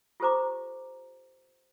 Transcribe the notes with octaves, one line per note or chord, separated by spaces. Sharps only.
F4 G4 A4 C5 A#5 D6